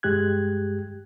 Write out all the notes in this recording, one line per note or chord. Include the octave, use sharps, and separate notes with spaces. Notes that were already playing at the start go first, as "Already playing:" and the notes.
G2 G#3 G4 F#6 G#6